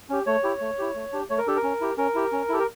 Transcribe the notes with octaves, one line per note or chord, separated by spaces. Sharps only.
C#4 G4
A3 C#5
E4 G4
A3
E4 G4
A3
D4 G4
A3 C#5
A#4
D4 G4 A4
A#4
C#4
E4 G4
C#4 A#4
E4 G4
C#4
E4 G4 A4
A#4